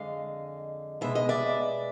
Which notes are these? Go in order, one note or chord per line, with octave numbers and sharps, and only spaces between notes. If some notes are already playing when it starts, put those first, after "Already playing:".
Already playing: F2 D3 G#3 D#5 F5
B2 G#3 B3 E5
D#5
D5 E5